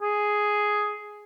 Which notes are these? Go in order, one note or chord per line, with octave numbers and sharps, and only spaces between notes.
G#4